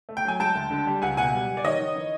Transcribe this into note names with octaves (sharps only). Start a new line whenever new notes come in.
A3
G5
F#3 G#5
G#3 G5 A5
D2
D3
G3
C#2 F#5 G#5
B2 F#5 G#5
G3
G3
D5
D#3 C#5 D#5
D#3
E3